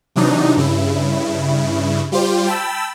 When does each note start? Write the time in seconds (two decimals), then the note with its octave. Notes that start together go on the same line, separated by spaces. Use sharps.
0.16 C3 E3 F#3 D4 D#4
0.56 G2 C#3 E4
2.12 G3 F4 G4 C5
2.47 G5 A5 B5 E6